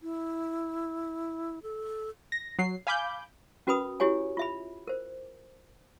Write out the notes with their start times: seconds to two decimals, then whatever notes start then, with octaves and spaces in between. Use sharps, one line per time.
0.01 E4
1.63 A4
2.32 A#6
2.59 F#3 C7
2.87 F5 G#5 B5 D6 G6
3.67 C#4 F#4 A#4 B4 B5 D#6
4.00 E4 F#4 G4 C#5 G#5
4.37 F4 E5 B5
4.87 A#4 C5